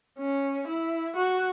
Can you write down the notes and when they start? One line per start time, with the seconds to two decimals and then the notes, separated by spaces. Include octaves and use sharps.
0.19 C#4
0.68 E4
1.16 F#4